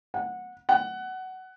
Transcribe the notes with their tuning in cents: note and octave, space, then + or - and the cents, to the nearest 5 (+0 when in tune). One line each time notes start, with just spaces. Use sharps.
F#5 -20
F#5 +15